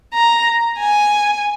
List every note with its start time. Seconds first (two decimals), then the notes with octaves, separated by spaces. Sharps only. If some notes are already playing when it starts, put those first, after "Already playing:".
0.14 A#5
0.79 G#5